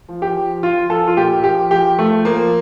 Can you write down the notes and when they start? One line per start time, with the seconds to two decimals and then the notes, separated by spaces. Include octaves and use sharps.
0.09 F3
0.22 G4
0.36 F3
0.62 F3 F4
0.90 F3 A4
1.08 F4
1.17 A#2 G4
1.44 F3 G4
1.71 F3 G4
1.98 F3 A3
2.25 F3 A#3